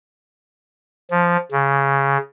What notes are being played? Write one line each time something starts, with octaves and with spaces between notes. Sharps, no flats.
F3
C#3